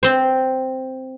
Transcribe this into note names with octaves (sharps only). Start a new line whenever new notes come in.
C4 C5